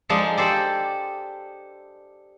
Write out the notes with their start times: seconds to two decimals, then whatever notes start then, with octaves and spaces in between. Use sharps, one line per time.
0.09 F3 G#3 D4 D#4 A4
0.37 G4 A4 C5 D5